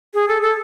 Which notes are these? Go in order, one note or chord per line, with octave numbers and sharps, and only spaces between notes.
G#4
A4
A4